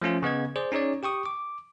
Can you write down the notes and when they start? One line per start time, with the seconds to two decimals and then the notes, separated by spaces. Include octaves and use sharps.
0.02 F3 A3 C#4 F4
0.22 C#3 B3 D#5 G#6
0.56 G#4 C5 D5
0.72 C#4 D#4 G#4 C#5 D5
1.03 G4 G5 C#6 D#6
1.26 D6